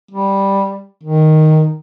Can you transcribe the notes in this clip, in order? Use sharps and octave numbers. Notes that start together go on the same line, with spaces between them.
G3
D#3